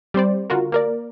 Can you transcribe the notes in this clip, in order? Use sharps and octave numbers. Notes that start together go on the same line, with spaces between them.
G3 C4 C5 D5
D3 F4 F#4 A#4
A#3 A#4 D5